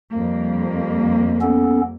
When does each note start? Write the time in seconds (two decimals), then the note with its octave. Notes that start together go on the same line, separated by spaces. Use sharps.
0.11 F2 G3 A#3
1.41 B3 C#4 A4